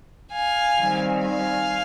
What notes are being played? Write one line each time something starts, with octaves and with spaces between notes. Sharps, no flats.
F5 G#5
D#3 G3 C4
F5 G#5